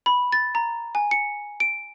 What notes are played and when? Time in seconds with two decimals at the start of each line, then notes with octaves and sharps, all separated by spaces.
0.06 B5
0.32 A6
0.55 A#5
0.95 G#5
1.11 C#7
1.60 D7